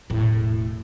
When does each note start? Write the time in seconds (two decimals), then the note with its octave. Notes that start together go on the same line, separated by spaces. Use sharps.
0.10 E1 A2